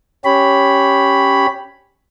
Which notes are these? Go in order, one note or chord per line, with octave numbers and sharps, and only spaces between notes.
C#4 G4 C#5 B5